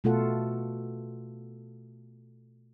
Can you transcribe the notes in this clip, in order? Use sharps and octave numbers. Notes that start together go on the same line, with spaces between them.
B2 A3 F4 F#4 A4 F#5